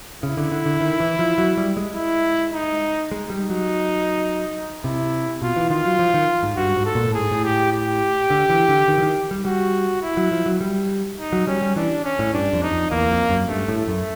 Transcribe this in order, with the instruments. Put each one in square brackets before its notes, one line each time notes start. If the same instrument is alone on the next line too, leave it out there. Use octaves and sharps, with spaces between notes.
[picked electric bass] C#3 [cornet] E4
[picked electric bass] D3
D3
D3
D#3
E3
F3
F#3
G3
G#3
[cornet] E4
D#4
[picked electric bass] G#3
G3
[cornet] D#4
[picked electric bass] F#3
[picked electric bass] C3 [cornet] E4
[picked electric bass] B2 [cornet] F4
[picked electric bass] E3
[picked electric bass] D#3 [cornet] F4
[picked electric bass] F#3
F3
D#3
G#2
[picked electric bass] G2 [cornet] F#4
[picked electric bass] G#2
[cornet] A4
[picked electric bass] A#2
A2
[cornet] G#4
[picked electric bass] G#2
A2
[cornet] G4
G4
[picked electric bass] D3
E3
D3
D#3
E3
D#3
G3
[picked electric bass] G3 [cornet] F#4
[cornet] E4
[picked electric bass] F#3
F3
F#3
G3
[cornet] D#4
[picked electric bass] F#3
[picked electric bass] G3 [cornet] C#4
[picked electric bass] G3
[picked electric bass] E3 [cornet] D4
[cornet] C#4
[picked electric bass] A2
[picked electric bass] G2 [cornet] D4
[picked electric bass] F2
[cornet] D#4
[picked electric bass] F2
[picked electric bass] E2 [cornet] A#3
[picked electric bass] F2
F#2
[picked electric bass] G2 [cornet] A3
[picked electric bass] A2
[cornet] A3
[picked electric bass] F#2